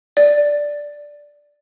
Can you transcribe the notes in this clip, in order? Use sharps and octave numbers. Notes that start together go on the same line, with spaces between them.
D5